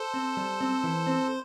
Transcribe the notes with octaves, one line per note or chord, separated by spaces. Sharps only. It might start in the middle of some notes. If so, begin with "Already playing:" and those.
Already playing: A4 C5
C4
G3
C4
E3
C4